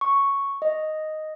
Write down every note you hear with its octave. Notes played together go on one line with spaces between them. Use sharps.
C#6
D#5